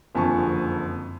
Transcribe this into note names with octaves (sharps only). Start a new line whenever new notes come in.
F#1 F2 D3 G#5 A5 C#6